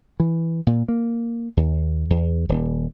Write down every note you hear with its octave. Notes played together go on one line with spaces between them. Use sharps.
E3
A#2
A#3
D#2
E2
D#1